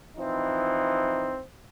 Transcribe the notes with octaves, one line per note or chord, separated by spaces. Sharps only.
E3 F3 C4 D#4